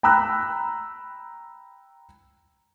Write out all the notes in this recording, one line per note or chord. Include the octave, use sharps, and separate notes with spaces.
G5 A#5 B5 E6 F#6